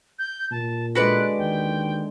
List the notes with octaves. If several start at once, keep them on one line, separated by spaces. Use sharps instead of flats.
G6
A#2 A5
D3 G#3 F#4 B4 D5 F#6
D#2 G5